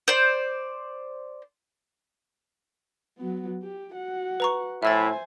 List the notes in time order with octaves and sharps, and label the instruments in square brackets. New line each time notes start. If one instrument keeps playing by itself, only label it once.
[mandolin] C5 D5
[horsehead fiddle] F#3 B3
G4
F#4 F#5
[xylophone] B4 A#5 C#6
[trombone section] A2 E4 [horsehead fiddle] C5 G#5 [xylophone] E5 E6 A6